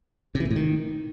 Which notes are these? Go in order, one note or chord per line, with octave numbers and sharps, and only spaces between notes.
C3
E3
A#2
A2
D#3